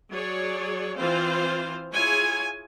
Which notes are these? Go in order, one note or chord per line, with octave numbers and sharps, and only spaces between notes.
F#3 G#4 C#5 D5
E3 C4 F4 C5 F5
E4 F4 G#4 C#5 G#5